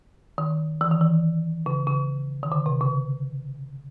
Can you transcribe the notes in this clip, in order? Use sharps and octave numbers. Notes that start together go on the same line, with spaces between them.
D#3
E3
D#3
E3
C#3
C#3
D#3
D3
C3
C#3